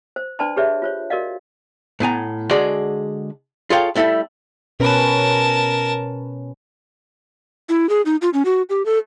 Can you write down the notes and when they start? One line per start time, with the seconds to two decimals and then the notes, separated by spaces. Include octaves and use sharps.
0.16 C5
0.39 D4 B4 D5 A5 B5 C6
0.56 G4 G#4 B4 C#5 D5 E5
0.82 F4 C5 C#5
1.10 F#4 A#4 D5 D#5 F5
2.00 A2 B3 G#5 A#5
2.51 D3 G#3 F#4 G#4 D5
3.70 F4 G#4 A4 C#5 F5 G5
3.95 G3 A3 E4 A4 E5
4.80 B2 C#4 A#4 B4 A5
7.69 E4
7.89 G#4
8.06 D#4
8.22 F4
8.34 C#4
8.45 F#4
8.70 G4
8.85 A4